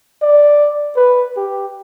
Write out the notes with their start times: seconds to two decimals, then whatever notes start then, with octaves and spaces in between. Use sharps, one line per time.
0.22 D5
0.96 B4
1.37 G4